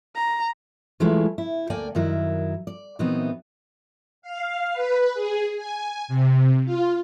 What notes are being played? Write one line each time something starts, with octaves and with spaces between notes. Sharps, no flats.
A#5
E3 F#3 G#3 A3 E4 F4
E4
D2 A#3 D5 G5 G#5
F#2 D#3 F#3 E4
D5
A#2 E3 F#3 B3 C4 D#4
F5
B4
G#4
G#5
C3
F4